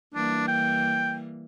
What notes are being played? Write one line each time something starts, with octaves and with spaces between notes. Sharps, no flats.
E3 G3 A#3 D4
G5